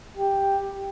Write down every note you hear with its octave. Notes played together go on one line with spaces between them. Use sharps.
G4